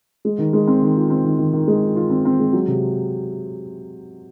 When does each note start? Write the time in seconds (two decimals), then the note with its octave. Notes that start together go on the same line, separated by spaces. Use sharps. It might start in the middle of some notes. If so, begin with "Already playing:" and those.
0.25 G#3
0.38 D#3
0.53 G#3
0.67 C4
0.82 D#3
0.96 F4
1.10 C4
1.24 D#3
1.39 D#3
1.53 D#3
1.68 G#3
1.82 F4
1.96 F4
2.10 C4
2.25 C4
2.40 G#3
2.53 F#3
2.68 C3